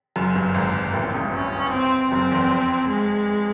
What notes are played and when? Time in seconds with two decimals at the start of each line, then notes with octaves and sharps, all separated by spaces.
0.16 F#1 F#2
0.35 G1 G2
0.54 G#1 G#2
0.93 A1 A2
1.03 A#1 A#2
1.14 C#2 C#3
1.24 G1 G2
1.34 C#4
1.72 C4
2.11 F#1 F#2 C4
2.32 E2
2.51 F2
2.89 G#3